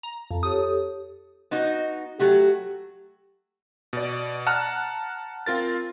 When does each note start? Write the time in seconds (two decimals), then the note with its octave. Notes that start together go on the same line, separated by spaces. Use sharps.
0.03 A#5
0.31 F2 A5
0.43 G4 A4 C#5 D#6
1.51 B3 D#4 F#4
2.20 F#3 A3 F#4 G4
3.93 B2 D5
4.46 F#5 A5 A#5 F6 F#6
5.46 C4 F4 A#4 A6